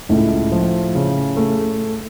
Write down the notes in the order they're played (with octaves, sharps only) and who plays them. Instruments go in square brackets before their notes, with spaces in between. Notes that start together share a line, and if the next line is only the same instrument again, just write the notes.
[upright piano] C#2 [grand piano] A2
[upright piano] F3
C#3
A3